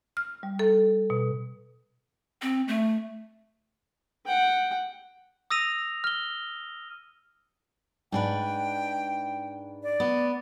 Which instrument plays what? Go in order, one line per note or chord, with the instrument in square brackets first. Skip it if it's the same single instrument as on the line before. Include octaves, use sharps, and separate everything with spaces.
[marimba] F6
G3
A4
B2
[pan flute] C4
A3
[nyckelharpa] F#5 G5
[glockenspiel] D#6 E6 A#6 D#7 F7
F6 G7
[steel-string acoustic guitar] G#2 D4 B4 [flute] G5
[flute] D5
[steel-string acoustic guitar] B3